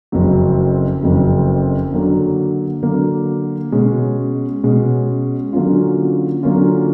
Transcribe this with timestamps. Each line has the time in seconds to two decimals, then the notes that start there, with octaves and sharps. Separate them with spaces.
0.12 F#1 F2 C#3 F#3
1.03 F#1 F2 C#3 F#3
1.92 D3 F#3 A#3
2.82 D3 F#3 A#3
3.72 B2 G#3 C#4
4.63 B2 G#3 C#4
5.53 D3 F#3 A#3 C#4 F4
6.43 D3 F#3 A#3 C#4 F4